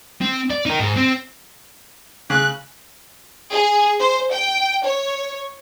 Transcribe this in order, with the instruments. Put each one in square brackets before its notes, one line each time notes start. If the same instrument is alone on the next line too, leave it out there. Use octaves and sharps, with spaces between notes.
[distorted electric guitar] C4
D5
D#4 A#4
G#2
C4
[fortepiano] C#3 [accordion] F#6
[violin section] G#4
C5
G5
C#5